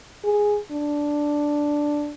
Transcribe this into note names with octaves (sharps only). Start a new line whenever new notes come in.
G#4
D4